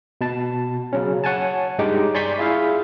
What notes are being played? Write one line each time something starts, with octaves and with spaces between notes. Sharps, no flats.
B2 A5
C#3 F#3 C#4
C#5 F#5 G#5 A5
G2 G#3 D#4 G4 D6
D5 G#5 C6 C#6 G6 B6
E4 F4 G#4 E5 F5